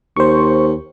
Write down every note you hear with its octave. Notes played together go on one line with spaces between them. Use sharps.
D#2 C5 C#6